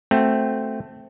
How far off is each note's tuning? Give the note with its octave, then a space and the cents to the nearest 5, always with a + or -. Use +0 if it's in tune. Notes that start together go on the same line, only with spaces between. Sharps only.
A3 +0 C4 +0 F#4 +0